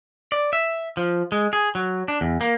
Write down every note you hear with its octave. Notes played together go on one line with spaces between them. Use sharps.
D5
E5
F3
G#3
G#4
F#3
D4
E2
A#3